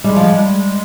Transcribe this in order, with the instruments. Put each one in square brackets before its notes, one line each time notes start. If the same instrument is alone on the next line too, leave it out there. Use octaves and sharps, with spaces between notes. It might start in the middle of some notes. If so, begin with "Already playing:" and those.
[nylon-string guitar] G3 [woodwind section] G#3
[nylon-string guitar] F3
G3
[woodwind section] G#3